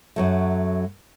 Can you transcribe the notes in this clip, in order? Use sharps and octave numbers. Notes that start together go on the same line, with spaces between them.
F#2 F#3 A3